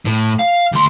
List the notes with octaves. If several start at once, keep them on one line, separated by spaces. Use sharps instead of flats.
A2
F5
D2 C6